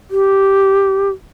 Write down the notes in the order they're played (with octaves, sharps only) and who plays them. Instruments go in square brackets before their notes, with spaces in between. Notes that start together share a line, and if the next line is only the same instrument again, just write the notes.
[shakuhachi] G4